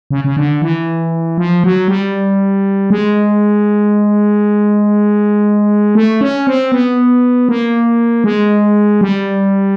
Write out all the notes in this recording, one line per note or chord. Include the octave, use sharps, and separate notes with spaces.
C#3
C#3
D3
E3
F3
F#3
G3
G#3
A3
C#4
C4
B3
A#3
G#3
G3